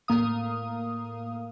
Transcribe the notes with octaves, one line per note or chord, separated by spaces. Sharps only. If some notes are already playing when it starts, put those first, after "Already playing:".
A2 A#3 F5 D#6